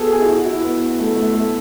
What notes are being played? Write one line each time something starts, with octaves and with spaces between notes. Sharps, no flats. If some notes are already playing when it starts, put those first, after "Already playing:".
Already playing: B3 F#4 G#4 A4
G#4
E4
F#4
E4
B3
A3
A3
A3